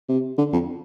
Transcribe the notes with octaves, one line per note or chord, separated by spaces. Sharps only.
C3
D3
F2